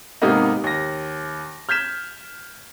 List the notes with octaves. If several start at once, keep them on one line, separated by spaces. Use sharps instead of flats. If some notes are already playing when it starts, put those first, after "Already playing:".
G#2 C3 A#3 B3 D#4
D#2 A#6
F6 G6 G#6 B6 E7